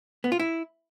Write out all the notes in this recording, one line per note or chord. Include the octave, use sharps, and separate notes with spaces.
B3
F4
E4